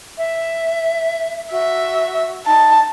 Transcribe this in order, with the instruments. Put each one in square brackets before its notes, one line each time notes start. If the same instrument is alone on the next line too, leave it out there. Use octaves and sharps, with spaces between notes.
[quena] E5
[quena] F#4 [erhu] E5
[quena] D#4 [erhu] A5